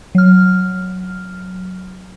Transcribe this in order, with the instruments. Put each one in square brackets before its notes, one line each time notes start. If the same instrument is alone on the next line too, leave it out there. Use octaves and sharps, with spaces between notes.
[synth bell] F#3 F6